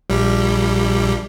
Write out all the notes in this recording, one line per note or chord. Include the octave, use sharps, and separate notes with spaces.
A#1 G3